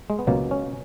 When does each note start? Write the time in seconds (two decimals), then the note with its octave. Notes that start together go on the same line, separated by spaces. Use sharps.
0.10 G#3
0.19 B3
0.27 C#2 B2 F#3 A#3
0.51 C#4